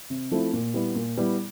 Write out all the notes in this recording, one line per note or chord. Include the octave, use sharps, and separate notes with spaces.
C3
F3 A3 C4 E4
A#2
G3 B3 E4
A#2
G3 B3 E4